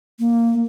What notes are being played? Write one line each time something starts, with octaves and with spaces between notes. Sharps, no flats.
A#3